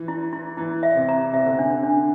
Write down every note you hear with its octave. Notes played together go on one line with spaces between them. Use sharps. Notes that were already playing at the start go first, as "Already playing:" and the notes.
Already playing: E3
E4
E4
E3 E4
E5
C3
A#5
C3 E5
D3
C3 D4
D4